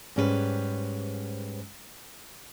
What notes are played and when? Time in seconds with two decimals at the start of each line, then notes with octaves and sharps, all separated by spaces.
0.16 G#2 G3 C#4 F#4 B4 C5